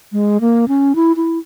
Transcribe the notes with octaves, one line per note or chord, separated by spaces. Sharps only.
G#3
A#3
C#4
E4
E4